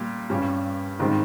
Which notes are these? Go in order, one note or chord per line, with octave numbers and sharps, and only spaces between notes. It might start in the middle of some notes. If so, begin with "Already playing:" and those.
Already playing: A#2 G3
G2 G3 C#4
G#2 D#3 G3 C4